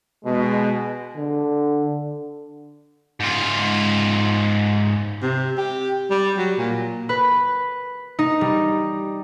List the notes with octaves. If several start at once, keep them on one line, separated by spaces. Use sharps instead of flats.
B2 G#3
D3
G#2 F4
C3
G4
G3
F#3
A#2
B4
D#4
G3